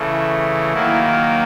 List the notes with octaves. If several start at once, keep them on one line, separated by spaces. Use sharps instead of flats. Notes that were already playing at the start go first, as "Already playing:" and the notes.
Already playing: C#3 E3 A3
D#3 F#3 A#3 E4